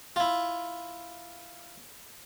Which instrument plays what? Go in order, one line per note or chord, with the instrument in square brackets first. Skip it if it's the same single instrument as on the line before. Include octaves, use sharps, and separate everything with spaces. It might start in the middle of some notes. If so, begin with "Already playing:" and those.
[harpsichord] E4 F4